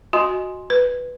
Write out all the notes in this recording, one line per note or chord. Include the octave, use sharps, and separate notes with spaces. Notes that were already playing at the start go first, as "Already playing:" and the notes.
F#4 D#5 G#5 C6
B4